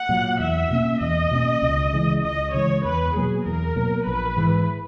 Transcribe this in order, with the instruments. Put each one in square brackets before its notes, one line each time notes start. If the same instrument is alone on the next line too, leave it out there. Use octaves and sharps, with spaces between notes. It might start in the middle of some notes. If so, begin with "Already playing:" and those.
Already playing: [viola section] F#5
[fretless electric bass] A#2 F#3
[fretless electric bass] E2 [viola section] E5
[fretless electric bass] B2 A#3 C#4
[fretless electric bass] E2 [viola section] D#5
[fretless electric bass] B2 A#3 C#4
C#2
C#3 E3 G#3
[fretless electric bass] C#2 [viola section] D#5
[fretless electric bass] C#3 E3 G#3 [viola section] C#5
[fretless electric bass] E2 [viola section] B4
[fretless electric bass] B2 F#3 A#3 [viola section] G#4
[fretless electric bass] E2 [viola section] A#4
[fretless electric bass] B2 F#3 A#3
[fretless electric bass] A#1 [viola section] B4
[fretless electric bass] G#2 E3 G#3